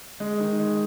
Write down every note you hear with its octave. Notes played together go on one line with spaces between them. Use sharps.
G#3
D#3
G#3